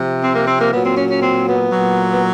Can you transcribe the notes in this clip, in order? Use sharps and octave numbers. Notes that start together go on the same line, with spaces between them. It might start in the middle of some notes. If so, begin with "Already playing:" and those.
Already playing: C3 F3
C4
A#3
C4
A#3
A#2 F#3 B3
C4
C#4
C#4
C4
B3
A#2 F#3
B3